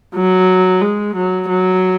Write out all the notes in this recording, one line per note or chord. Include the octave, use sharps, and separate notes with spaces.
F#3
G#3
F#3
F#3